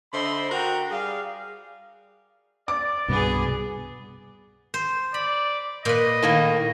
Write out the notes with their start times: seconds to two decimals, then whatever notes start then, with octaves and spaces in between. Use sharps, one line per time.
0.13 D3 C5 D#5 E5 B5 C6
0.50 F#4 A#4 F#5 G5 A#5
0.91 G3 G#4 D5 F5
2.68 D5 D6
3.08 C2 G2 B2 B3 G#4
4.74 C5
5.14 D5 B5
5.85 A#2 B4 D#5
6.23 A2 D#3 A#3